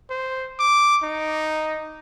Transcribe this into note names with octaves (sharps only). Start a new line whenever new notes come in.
C5
D6
D#4